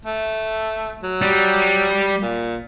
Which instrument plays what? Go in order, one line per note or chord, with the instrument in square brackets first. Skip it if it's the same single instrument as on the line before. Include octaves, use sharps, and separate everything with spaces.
[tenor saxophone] A3
F#3
[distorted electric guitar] G3
[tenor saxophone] A#2